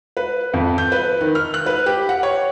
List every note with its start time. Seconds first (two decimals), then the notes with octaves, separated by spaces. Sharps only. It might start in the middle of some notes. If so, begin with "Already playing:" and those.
0.17 B4
0.54 F2
0.78 G6
0.92 B4
1.21 D#3
1.35 F6
1.54 F#6
1.66 B4
1.86 G4
2.09 F#5
2.23 C#5